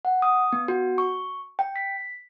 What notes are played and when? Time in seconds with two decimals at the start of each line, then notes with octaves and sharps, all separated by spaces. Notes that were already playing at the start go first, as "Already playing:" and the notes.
0.05 F#5
0.22 D#6
0.53 B3
0.68 F#4
0.98 C#6
1.59 G5
1.76 B6